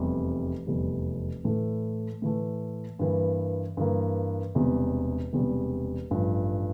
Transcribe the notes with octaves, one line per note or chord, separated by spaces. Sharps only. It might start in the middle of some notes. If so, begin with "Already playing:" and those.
Already playing: F1 E2 C3 G3
F1 E2 C3 G3
A2 E3 A3
A2 E3 A3
G2 E3 A#3
G2 E3 A#3
E1 E2 C3 G3
E1 E2 C3 G3
A1 G2 F3